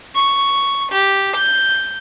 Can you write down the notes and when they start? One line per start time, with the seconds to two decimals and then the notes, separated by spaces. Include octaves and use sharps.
0.15 C#6
0.91 G4
1.36 G6